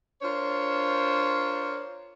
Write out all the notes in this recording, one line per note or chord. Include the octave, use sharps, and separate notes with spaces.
D4 F4 A#4 C5 C#5